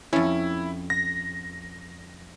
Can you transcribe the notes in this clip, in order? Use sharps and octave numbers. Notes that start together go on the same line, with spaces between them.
F2 C#4 E4
A#6